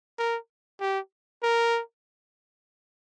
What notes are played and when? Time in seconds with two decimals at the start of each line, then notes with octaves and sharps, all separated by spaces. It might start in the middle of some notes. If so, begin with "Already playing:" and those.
0.19 A#4
0.81 G4
1.43 A#4